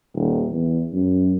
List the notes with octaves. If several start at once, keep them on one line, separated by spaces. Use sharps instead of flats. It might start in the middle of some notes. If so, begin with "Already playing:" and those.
D#1
E2
F#2